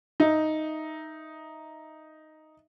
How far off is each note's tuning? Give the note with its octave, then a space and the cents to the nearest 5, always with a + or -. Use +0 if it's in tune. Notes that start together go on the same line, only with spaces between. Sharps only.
D#4 +0 E5 +0